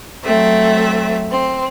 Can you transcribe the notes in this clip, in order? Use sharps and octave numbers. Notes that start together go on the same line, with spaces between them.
F#3 A3 C4 E5
C4